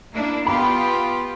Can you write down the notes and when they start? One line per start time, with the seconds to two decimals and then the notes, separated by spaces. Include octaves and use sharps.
0.13 A#3 D4 E4
0.47 B3 F4 G4 B5